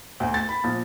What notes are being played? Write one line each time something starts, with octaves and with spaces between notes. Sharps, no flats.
D2
A6
B5
A#1